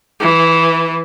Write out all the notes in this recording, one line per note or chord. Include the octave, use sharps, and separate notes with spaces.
E3